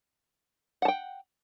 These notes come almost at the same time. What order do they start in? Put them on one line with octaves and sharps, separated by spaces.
F#5 A5 G5